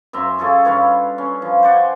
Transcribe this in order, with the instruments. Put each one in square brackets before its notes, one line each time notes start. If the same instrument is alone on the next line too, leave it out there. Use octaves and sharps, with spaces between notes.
[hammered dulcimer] F#2 E5 A#5 C6
F4 G#4 A4 C#5
G2 B4 C#5 F5
C#4
F3
C5 D5 F#5 G#5